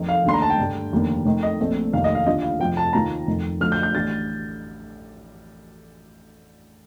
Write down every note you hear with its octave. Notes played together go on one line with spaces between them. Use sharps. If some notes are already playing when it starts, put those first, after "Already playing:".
Already playing: F1 F2 D#3
F5
D#2 D3 A3 D4 C6
A#5
A5
G5
G2 D3 G3
F1 D#2 D3 G3 A#3
F2 D#3 A3 D#4
D#5
A#1 A#2 A3 C4
F1 D#2 D#3 G3 F5
D#5
F5
D#2 D3 G3 D4 F4 D#5
F5
F2 C3 F3 G5
A5
D#2 D#3 A#3 F4 A#5
F1 F2 D#3
D2 D3 F3 A3 F6
G6
G6
A1 A2 G3 D4 A6